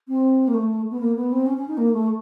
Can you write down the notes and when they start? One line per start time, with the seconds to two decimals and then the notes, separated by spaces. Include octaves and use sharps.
0.08 C4
0.47 A#3
0.54 A3
0.91 B3
1.00 A#3
1.16 B3
1.32 C4
1.46 C#4
1.57 C#4
1.68 D#4
1.77 A#3
1.93 A3